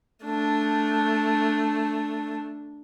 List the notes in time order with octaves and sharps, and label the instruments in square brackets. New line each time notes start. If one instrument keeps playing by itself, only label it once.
[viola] A3 D4